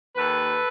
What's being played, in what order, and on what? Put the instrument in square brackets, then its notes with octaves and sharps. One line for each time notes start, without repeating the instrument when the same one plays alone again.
[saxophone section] D#2 A4 B4